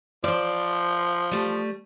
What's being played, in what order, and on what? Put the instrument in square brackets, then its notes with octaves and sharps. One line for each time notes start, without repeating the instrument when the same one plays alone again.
[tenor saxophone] F3 [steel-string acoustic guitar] C5 D5
[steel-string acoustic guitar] G3 A3